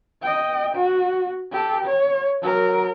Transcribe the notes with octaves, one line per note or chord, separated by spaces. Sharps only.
D#5 G5
F#4
G4 A4
C#5
F#3 A#4